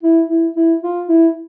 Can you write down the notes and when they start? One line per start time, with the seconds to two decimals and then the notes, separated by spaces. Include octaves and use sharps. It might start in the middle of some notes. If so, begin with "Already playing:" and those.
0.03 E4
0.29 E4
0.56 E4
0.83 F4
1.09 E4